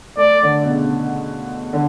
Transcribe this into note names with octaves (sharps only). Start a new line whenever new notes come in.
A3 D5
D3
B2
C#3
D3